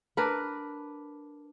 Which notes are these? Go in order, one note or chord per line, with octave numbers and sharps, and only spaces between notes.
D4 A#4 B4